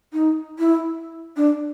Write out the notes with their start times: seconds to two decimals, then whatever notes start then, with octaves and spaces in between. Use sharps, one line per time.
0.13 D#4
0.59 E4
1.36 D4